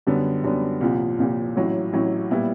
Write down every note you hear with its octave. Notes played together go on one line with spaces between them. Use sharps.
F#2 D3 G3 B3
F#2 D3 G3 B3
C2 A#2 F3
C2 A#2 F3
A1 A2 F#3
A1 A2 F#3
A#2 G3 B3 E4